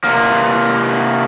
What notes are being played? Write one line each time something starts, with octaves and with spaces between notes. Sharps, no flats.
C3 A#3